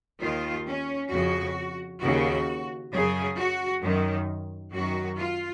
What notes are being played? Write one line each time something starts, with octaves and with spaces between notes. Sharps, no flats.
D#2 D#3 F4
C#4
F2 C#3 F#4
D#2 C#3 F#4
F#2 C#3 G#4
F#4
F#2 D#3
F#2 D#3 F#4
F4